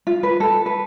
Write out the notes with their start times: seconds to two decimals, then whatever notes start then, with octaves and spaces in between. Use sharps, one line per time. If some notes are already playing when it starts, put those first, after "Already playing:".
0.07 F4
0.23 B4
0.40 A4
0.66 B4